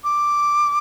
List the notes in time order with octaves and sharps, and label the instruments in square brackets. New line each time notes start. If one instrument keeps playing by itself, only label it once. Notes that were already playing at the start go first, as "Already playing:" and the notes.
[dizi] D6